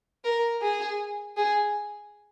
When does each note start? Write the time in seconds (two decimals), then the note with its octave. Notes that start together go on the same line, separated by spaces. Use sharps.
0.24 A#4
0.62 G#4
1.37 G#4